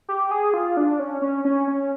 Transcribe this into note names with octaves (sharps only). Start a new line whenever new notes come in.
G4
G#4
F4
D4
C#4
C#4
C#4
C#4